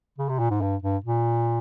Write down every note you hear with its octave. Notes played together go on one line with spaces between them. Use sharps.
C#3
C3
A#2
G#2
G2
G2
A#2